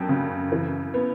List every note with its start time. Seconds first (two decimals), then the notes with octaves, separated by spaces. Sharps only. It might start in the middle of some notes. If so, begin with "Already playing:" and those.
Already playing: F#2 D4 G5 A5
0.09 C#3
0.52 E3
0.94 B3